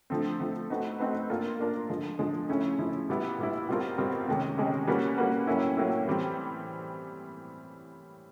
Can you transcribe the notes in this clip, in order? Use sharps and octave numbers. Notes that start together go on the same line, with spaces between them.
D3 F3 A3 C4
D3 F3 A3 C4
A3 C4 D#4 F#4 B4
A3 C4 D#4 F#4 B4
A#3 D4 F4 A#4
A#3 D4 F4 A#4
D3 F3 G#3
D3 F3 G#3
C#3 F3 A3 C#4 E4
C#3 F3 A3 C#4 E4
A#2 G3 B3 E4
A#2 G3 B3 E4
B2 G3 C4 F4 A#4
B2 G3 C4 F4 A#4
C3 D#3 G#3 C#4
C3 D#3 G#3 C#4
G3 A#3 C#4 F#4 B4
G3 A#3 C#4 F#4 B4
A2 F#3 A#3 C#4 E4
A2 F#3 A#3 C#4 E4
A2 E3 G3 C4